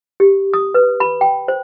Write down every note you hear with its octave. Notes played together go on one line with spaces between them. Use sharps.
G4
D#6
B4
B5
G5
C5